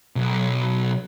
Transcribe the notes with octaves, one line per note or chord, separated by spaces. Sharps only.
B1